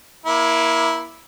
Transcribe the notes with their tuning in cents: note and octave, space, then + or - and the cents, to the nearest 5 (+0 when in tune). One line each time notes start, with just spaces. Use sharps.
A#3 +25 E4 +0